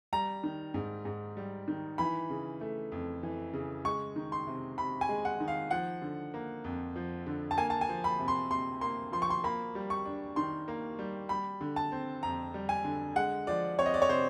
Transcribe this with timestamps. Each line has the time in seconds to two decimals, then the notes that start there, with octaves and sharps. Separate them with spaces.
0.13 G3 A#5
0.44 D#3
0.74 G#2
1.05 G#2
1.37 G3
1.68 D#3
1.98 E3 B5
2.30 C#3
2.61 A3
2.92 F2
3.23 E3
3.53 C#3
3.85 G#3 C#6
4.16 D#3
4.32 C6
4.47 C3
4.78 C3 B5
5.01 G#5
5.09 G#3
5.25 F#5
5.40 D#3
5.48 F5
5.71 F3 F#5
6.02 D3
6.34 A#3
6.64 F2
6.96 F3
7.26 D3
7.51 A5
7.57 A#3 G#5
7.70 A5
7.81 G#5
7.89 F3
8.04 B5
8.19 C3
8.28 C6
8.51 C3 C6
8.81 A#3 C6
9.12 F3 C6
9.22 C#6
9.30 C6
9.44 A#3 B5
9.75 G3
9.90 C#6
10.05 D4
10.36 D#3 C6
10.68 A#3
10.99 G3
11.29 G3 B5
11.61 D3
11.76 A5
11.92 C4
12.23 F2 A#5
12.54 G3
12.69 G#5
12.84 D3
13.16 G#3 F#5
13.47 F3 D5
13.78 C4 C#5
13.86 D#5
13.94 D5
14.02 C#5
14.09 C3 C5